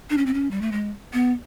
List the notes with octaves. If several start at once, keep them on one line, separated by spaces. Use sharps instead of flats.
D4
C#4
C4
C#4
G3
A3
G#3
B3